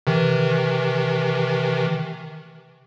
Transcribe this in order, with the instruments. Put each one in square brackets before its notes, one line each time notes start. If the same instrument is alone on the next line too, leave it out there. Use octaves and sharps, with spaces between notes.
[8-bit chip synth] C3 D#3 E3